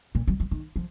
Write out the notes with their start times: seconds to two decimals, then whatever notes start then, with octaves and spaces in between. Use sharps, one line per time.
0.15 A#2
0.28 F#3
0.40 F3
0.51 D#3
0.76 F3